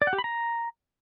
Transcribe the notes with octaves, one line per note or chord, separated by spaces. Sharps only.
D5
F#5
G4
B5
A#5